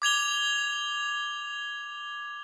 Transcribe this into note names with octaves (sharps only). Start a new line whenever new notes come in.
D6 G#6 F7 G7